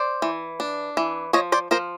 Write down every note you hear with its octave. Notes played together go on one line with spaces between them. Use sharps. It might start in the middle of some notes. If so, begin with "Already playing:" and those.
Already playing: C5 D5
E3
D4
E3
F3 C#5 D#5
C5 D5
F3 A#4 C5